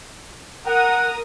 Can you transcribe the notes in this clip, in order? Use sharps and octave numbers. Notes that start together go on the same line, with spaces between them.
A#4 F#5 D#6